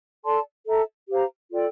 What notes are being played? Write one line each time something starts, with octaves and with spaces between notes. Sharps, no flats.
A4 D5 A5 C6
A4 E5 A#5
G4 C5 F5 A#5
F4 A4 D5 G5